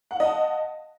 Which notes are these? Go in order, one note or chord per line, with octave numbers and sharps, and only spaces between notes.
D#5 F5 F#5 A5